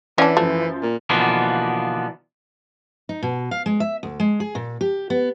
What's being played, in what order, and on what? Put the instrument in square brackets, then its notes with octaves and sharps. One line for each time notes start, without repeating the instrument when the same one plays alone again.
[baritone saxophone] E3 [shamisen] C#4 D4 [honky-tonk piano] D5 E5 F#5
[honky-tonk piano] F#2 F3 [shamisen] A3
[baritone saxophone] A#2
[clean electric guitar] B2 D3 E3 F3 A#3 B3
[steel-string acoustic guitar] D#4
B2
F5
G#3
E5
D2
G#3
G#4
A#2
G4
B3